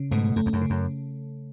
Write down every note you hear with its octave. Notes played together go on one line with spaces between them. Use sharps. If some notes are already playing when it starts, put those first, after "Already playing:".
Already playing: C#3
G#2 B2 A3
F#2 A3
E2
F#2
C#3
F#2